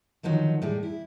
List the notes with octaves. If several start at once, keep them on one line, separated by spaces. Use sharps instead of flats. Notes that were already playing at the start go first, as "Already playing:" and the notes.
D3 D#3 F3 F#3 D#4
A2 G3 G#4
E4